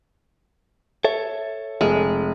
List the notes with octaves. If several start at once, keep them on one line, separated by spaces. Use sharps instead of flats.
A4 C#5 E5
F1 G#3